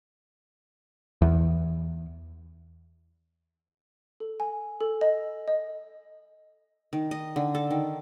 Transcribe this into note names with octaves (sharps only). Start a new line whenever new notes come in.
E2
A4
G#5
A4
D#5
D#5
D#3
D#5
D3
A4
D#3